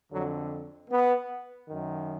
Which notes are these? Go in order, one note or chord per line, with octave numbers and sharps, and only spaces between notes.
F2 D3 F#3
B3
F#2 D#3